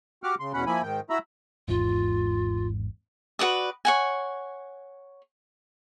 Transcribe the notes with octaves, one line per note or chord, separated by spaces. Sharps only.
F#4 G4 F#5 D6 F6
C#3 C6
E2 B2 C#4 F#5 B5
F3 A#3 E4 G#5 B5
G#2 D#3 G5
E4 F#4 E5 A#5 B5 E6
G#1 E2 G#2 F4
F#4 B4 D5 D#6
C#5 F#5 G#5